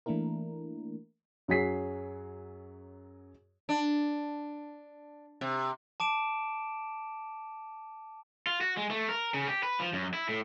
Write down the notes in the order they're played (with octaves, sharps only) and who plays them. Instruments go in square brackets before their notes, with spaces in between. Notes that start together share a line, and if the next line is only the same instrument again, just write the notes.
[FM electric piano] E3 A3 A#3 D4 E4 A#4
[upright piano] F#2 F#3 G#4 B6 C7
[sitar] D4
C3
[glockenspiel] A5 D6 D7 E7
[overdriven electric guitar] F4
F#4
G#3
A3
A#4
C#3
G4
B4
F3
F#2
E4
A2